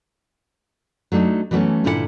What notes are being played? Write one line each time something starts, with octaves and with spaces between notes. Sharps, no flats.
F#3 A3 D4 D#4
E3 F#3 G3 A3 B3 C#4
G2 A#2 D3 E4 A#4 F#5